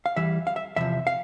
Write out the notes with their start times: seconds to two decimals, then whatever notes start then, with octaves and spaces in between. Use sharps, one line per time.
0.06 F5
0.17 E2 E3 G3 E5
0.47 F5
0.56 E5
0.76 E2 C3 F3 E5
1.07 F5